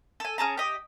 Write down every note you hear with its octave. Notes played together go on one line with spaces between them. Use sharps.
A4 G#5
C#4 G#4 A5 A#5
G4 D#5